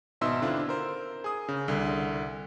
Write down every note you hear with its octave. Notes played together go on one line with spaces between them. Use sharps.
G#1 B2 D#4 E5 C6 E6
D3 C4 D4 E4 F4
A#4 C5
G#4 D#6
C#3
C2 D3